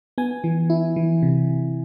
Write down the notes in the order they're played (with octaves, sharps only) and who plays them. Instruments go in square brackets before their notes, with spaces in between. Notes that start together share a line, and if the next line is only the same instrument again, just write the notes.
[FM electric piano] B3 G#5
E3
E4
E3
C3